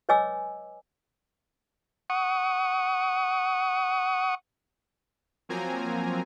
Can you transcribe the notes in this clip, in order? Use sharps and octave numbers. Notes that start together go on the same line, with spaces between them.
B4 C#5 D#5 G#5 D6 E6
F#5 C#6 D#6
F3 F#3 A#3 C4 G#5 A#5